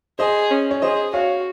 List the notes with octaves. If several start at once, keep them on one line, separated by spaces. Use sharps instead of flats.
G#4 C5 D#5
C#4
C#5
G#4 C5 D#5
F#4 C#5 F5